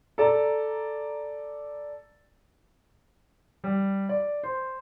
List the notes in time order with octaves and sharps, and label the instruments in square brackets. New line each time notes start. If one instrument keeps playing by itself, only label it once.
[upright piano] A4 D5 A#5
[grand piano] G3
D5
C5